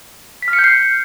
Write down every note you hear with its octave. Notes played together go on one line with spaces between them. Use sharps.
B6
F6
C#7
G6
C7